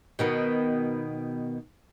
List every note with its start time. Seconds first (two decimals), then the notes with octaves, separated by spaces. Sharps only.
0.19 B2 D#3 B3